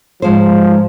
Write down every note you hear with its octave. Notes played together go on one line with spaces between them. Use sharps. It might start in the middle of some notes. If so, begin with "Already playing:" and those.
G#2 F3 G#3 C5